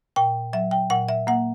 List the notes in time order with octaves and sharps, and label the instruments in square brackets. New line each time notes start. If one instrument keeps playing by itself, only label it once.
[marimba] A#2 G5
F#3 E5
G5
A#2 F#5
E5
A#3 F#5